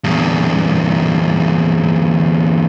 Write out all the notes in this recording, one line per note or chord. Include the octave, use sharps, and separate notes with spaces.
E2 G2